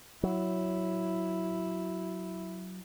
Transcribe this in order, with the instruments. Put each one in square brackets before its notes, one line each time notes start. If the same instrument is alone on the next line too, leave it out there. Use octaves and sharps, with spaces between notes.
[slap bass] F#3 [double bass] E4